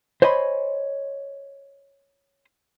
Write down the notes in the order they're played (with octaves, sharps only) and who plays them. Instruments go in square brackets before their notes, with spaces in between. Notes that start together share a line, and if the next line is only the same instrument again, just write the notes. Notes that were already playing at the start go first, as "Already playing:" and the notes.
[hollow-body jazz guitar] C5 C#5 D#5 G#5 B5 C6